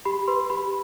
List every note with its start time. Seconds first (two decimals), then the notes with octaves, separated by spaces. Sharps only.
0.05 G4 B5
0.27 B4 C6
0.50 G4 B5